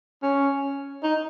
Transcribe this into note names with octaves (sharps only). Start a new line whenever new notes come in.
C#4
D#4